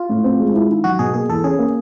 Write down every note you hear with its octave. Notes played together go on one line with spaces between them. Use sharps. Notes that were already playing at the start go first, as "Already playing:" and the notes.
Already playing: F4
A2
C4
G#3
E4
D#3
F#3 F#4
B2 G#4
A#3 G#4
E2 A4
C#4 G#4
A#3